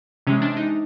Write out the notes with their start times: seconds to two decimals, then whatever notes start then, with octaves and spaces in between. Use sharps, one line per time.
0.27 C3 E3 G#3 C#4
0.42 D4
0.57 D#4